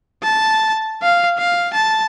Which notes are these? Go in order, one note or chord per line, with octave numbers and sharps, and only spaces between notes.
A5
F5
F5
A5